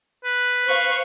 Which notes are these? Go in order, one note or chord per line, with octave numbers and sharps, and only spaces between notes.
B4
C5 F5 C#6